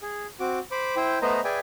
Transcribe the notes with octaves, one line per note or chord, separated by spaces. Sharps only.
G#4
C4 F#4 D6
C5 B5 D6
E4 C5 G5
A3 B3 B4 C5 D#5 A#5
G#4 B4 D5 E5 G5 G#5